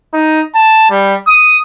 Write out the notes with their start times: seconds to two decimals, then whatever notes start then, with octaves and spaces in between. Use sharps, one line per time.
0.13 D#4
0.55 A5
0.90 G3
1.27 D#6